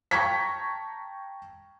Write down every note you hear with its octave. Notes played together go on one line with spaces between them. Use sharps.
G5 A5 A#5 C#6 G#6 B6